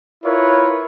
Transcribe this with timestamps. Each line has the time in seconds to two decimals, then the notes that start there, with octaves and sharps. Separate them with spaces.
0.24 E4 F4 A#4 B4 C#5